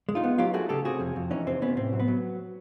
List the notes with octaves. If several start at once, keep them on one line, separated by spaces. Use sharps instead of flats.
G#3
D#4 F4
B3
F#3 F4 G4
A3 F#4 G#4
C#3 G4 A4
C3 F#4 G#4
F2
F2
E3 C#4 D#4
C3 C4
C3 B3 C#4
A2 C4
F#3
B3
F#3